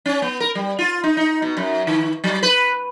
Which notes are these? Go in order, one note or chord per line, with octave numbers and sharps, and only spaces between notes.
C#4
B3
A#4
G3
F4
D#4
D#4
B2
F#2
D#3
F#3
B4